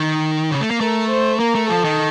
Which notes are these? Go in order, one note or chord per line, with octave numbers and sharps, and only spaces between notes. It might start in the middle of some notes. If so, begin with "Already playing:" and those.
Already playing: D#3
C#3
A3
A#3
A3 A#4
C5
A#3 A#4
A3
F3 A4
D#3